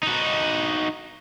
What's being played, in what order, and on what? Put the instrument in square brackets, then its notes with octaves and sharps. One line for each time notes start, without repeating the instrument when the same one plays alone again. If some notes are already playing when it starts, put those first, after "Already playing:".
[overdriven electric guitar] D#4 F#4